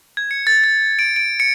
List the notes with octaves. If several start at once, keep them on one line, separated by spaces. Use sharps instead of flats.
G#6
C#7
A6
A6
D7
D7
C#7